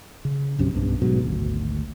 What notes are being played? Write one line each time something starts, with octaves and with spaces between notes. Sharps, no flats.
C#3
A#1 F#2 C3 C#4
B1 G2 B2
G#2 B2 F#3
G#1 D2